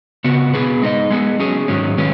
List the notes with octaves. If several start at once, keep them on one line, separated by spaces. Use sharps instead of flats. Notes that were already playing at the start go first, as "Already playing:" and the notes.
C#3 B3 F#4
B2 B3 G#4 B4
G#3 D#4 B4 D#5
G#3 B3 G#4
F#3 C#4 G#4
G#2 D#3 F#3 C#4
D#3 G#3 C#4 B4